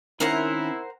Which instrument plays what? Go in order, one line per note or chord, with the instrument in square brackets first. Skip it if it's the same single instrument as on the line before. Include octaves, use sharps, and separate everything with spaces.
[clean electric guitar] D#3 C4 C#4 [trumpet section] E4 [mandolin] A#4 C5 F#5